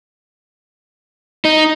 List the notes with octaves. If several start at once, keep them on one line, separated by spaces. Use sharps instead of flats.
D#4